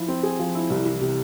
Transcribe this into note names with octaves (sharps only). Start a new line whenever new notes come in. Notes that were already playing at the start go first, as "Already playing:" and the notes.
Already playing: F3 E4
C4
G#4
F3
E4
C2
E3
C3